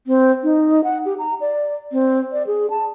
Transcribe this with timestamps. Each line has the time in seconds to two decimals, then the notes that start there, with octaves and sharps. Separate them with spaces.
0.07 C4
0.44 D#4
0.84 F#5
1.05 G4
1.19 A#5
1.41 D5
1.92 C4
2.33 D5
2.47 G#4
2.70 A5